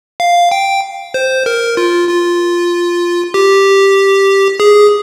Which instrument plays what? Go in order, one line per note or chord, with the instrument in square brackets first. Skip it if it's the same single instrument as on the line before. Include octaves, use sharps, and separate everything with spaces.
[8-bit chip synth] F5
G5
C5
A#4
F4
F4
G4
G#4